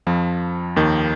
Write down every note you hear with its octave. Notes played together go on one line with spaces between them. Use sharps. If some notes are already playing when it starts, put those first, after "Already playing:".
F2 F3
D#2 D#3